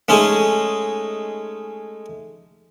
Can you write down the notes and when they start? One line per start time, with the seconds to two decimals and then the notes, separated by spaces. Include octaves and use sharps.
0.08 G#3 A3 C#4 D#4 G#4